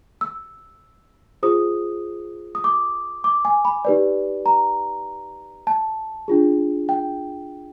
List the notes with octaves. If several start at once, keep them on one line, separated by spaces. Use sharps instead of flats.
E6
F4 G#4 C5 D#6
D#6
D6
D6
G#5
B5
D#4 G4 B4 D5
A#5
A5
D4 F4 G#4
G5